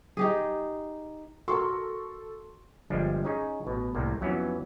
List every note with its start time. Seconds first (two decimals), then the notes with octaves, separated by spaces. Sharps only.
0.17 D#4 G4 G#4
1.48 F#4 A4 A#4 C6 C#6
2.90 G1 F3 G3 G#3 D4
3.25 C#4 D#4 G#4 C#5 G#5
3.65 A1 B2
3.95 C2 A2 C3 A#3
4.21 F2 E3 F#3 B3 C#4